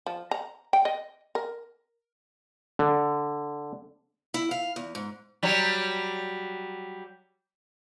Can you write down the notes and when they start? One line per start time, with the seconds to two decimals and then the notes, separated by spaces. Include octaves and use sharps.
0.06 F3
0.31 A#5
0.73 G5
0.85 D#5
1.35 A#4
2.79 D3
4.34 E4
4.51 F5
4.76 E2
4.95 G#2
5.43 F#3 G3